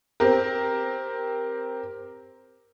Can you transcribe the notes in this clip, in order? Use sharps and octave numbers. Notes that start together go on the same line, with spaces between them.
C4 G4 A#4